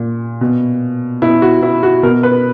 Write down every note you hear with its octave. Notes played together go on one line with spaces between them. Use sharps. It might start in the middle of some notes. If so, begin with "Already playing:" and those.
Already playing: A#2
B2
B2 E4
F#4
E4
F#4
B2 A#4
B4